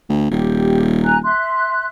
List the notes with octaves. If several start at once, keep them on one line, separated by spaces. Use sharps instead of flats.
D2
D#1 G4
G#5 A#5 F#6
E5 C6 F#6